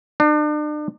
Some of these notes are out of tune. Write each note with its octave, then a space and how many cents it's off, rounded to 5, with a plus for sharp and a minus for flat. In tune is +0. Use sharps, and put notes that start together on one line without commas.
D4 +40